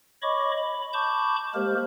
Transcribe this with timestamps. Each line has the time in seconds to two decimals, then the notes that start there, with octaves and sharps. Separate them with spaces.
0.22 C#5 D#5 B5 C#6 D6
0.58 B5
0.93 A5 B5 C#6 D6 G6
1.54 G#3 A#3 G4 A#4 C5